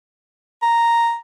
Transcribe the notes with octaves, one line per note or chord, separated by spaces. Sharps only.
A#5